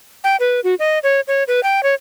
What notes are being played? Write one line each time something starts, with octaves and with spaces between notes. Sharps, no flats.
G5
B4
F#4
D#5
C#5
C#5
B4
G5
C#5